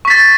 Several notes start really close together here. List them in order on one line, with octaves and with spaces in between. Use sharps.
C#6 B6 A6